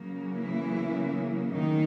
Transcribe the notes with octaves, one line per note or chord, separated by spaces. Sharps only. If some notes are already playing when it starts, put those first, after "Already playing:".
Already playing: C#3 F#3 A#3
E3 E4
D#3 D#4